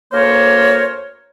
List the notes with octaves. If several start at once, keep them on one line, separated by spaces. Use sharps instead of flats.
D2 A#3 A#4 C5 C#5